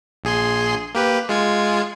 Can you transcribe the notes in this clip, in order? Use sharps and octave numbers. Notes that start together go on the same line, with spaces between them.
A#1 G#4 C6
A#3 G4 B4
G#3 F4 G#6